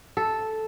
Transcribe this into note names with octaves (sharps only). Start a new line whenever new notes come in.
A4